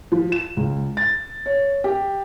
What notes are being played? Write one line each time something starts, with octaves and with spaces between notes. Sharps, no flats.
F3
E7
C#2
A6
C#5
G4